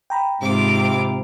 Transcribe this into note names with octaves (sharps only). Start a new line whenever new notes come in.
G5 A#5 B5
G#2 C3 F4 D6